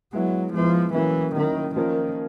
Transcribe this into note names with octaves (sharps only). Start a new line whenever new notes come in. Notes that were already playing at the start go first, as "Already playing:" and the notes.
F#3 G#3 B3 E4
F3 G#3 B3 E4
E3 F#3 A#3 C#4 E4
D#3 F#3 A#3 C#4 E4
D#3 F3 A#3 C#4 F4 A#4